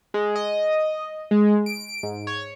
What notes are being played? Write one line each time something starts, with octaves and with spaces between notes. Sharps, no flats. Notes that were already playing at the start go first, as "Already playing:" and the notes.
G#3
D#5
G#3
D7
G#2
C#5